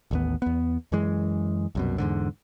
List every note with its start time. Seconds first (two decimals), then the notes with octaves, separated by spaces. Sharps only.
0.11 A1 D#2 B3
0.42 E2 B3
0.92 F#2 E3 G#3
1.75 C2 F#2 B2
1.98 E2 G#2 D3